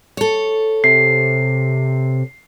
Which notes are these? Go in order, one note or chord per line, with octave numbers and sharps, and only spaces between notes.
A4 C#5
C3 C7